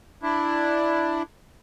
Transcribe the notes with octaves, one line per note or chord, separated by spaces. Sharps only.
D4 E4